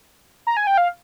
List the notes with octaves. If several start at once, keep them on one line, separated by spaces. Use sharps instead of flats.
A#5
G#5
G5
F5